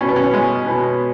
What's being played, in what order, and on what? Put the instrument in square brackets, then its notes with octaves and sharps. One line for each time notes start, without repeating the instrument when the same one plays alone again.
[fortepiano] B2 C#4
B3
C#4
G#3
B2